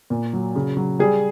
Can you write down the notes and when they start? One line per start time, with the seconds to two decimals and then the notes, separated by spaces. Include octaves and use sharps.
0.10 A#2
0.33 F#3
0.56 C#3
0.77 F#3
0.99 G3 G#4